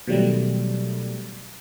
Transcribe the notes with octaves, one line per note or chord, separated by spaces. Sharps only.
B2 D#3 F#3 G3 A3